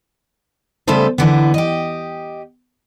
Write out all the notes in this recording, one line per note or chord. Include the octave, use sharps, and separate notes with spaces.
C#3 G3 A3 B3 A4 C5
D3 E3 B3
G4 D#5